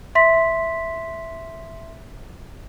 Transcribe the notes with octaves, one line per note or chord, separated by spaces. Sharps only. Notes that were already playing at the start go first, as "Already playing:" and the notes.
E5 C6 B6